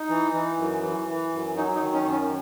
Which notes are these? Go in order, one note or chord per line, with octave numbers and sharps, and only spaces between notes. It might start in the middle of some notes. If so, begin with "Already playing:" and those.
Already playing: D#4
E3
E3
F#2
E3
E3
F#2
F#3 D#4
D#4
D#3
C#4
F#2
C#4